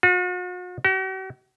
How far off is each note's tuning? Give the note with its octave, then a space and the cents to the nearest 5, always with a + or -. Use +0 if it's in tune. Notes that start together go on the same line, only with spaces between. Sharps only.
F#4 -45
F#4 +45